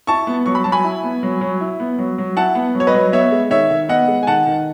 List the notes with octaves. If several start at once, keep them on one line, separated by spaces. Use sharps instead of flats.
E4 A5 C#6
B3
F#3 C#6
B5
F#3 A5
G#5 B5
E4
B3
F#3
F#3
E4
B3
F#3
F#3
E4 F#5 A5
B3
F#3
C#5
B4 D#5
F#3
B3 C#5 E5
G#3
D#3 C#5 E5
D#3
B3 D#5 F#5
G#3
G#5
D#3 F#5 A5
D#3